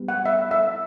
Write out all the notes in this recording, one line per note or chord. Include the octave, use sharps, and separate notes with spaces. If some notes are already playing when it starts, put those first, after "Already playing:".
Already playing: G3 B3
F#5
E5
E5